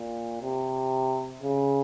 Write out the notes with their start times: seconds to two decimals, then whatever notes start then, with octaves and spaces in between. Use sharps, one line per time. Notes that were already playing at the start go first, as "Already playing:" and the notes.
Already playing: A#2
0.42 C3
1.43 C#3